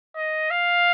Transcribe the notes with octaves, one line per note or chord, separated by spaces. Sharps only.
D#5
F5